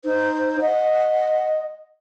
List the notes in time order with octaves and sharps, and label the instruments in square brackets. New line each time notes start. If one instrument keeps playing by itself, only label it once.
[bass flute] D#4 [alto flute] C5
[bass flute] D#5 [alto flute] F#5